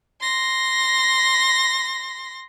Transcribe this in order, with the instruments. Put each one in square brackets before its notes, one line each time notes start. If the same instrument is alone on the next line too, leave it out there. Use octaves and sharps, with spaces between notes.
[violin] C6 A#6